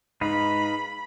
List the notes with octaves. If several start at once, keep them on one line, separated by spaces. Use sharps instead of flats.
G#2 D#4 B4 F5 B5